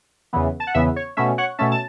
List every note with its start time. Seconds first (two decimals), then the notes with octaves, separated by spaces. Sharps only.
0.33 E2 C#3 E3 B3
0.60 A5
0.67 F#5
0.74 E2 C#3 E3 B3 E5
0.96 C#5
1.17 B2 A3 C#4 E5
1.38 C#5 F#5
1.58 B2 A3 C#4 E5 A5
1.72 A5